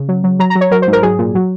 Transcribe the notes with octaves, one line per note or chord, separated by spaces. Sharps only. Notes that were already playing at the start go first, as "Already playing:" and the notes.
Already playing: C#3
F#3
F#3
F#3 A#5
A#5
F#3
C#5
F#3 A#4
C5
G#2
A#4
F#3 G#4
A#2
F#3